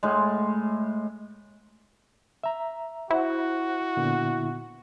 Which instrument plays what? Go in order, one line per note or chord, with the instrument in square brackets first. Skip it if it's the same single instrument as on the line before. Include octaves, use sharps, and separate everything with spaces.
[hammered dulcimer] A2 G#3
[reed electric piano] E5 A#5
[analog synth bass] E4 [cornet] F#4 [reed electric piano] C5 F#5
[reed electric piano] A#2 D3 B3